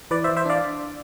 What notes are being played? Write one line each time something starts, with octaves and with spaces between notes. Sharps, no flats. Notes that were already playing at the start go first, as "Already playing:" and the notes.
E3 B4 D5
C5 E5
E3
C5 E5
D4 D5 F5